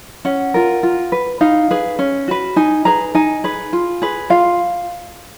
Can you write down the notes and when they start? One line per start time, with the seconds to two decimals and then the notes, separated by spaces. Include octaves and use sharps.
0.25 C#4 F#5
0.54 F4 A#4
0.83 F4
1.12 B4
1.41 D#4 F5
1.71 G#4 B4
1.99 C#4
2.28 F#4 B4
2.56 D#4 G#5
2.85 G#4 B4 A#5
3.15 D#4 G#5
3.44 G#4 B4
3.73 F4
4.02 G#4 B4
4.30 F4 F5